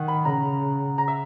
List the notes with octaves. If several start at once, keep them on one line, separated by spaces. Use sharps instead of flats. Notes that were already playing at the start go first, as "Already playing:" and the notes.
Already playing: D#3 F#5
B5
C#3 A#5
A#5
E5